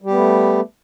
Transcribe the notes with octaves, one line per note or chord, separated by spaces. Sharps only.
G3 A3 B3 G4